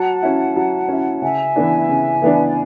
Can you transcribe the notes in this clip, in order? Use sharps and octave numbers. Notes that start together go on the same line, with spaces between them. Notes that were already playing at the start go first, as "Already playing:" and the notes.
Already playing: F#3 F#5 A5
C#4 E4
F#3
C#4 E4
C#3 E5 G#5
E3 B3 D4
C#3
E3 B3 D4
D5